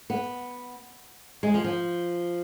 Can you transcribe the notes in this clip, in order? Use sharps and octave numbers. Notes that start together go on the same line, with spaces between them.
B3
G#3
F3
F3